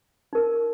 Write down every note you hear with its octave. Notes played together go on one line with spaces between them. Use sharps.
D#4 A#4